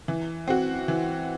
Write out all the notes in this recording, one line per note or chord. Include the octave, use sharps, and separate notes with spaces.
E3
C4 F#4
E3